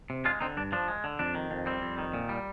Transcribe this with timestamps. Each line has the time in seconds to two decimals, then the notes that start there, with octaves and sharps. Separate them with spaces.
0.10 C3
0.25 G#3 D4 F4
0.40 D3 C4 D#4
0.57 G2 D4
0.72 F3 D4
0.88 G#3
1.04 D3
1.19 F2 D4
1.35 D#3
1.51 F2
1.66 G3 C4
1.82 F2
1.98 D#3
2.14 A#2
2.29 G3